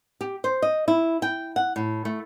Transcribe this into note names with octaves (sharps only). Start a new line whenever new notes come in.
G4
C5
D#5
E4
G5
F#5
A2
A3